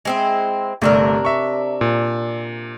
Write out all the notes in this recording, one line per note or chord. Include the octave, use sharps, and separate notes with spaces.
G#3 C4 E4
G1 C3 A3 D4 A#4 E6
E5 C#6
A#2